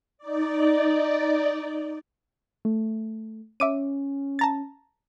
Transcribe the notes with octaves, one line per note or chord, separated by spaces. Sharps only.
D#4 D5
A3
C#4 E5 D6 D#7
A5 A#5 A6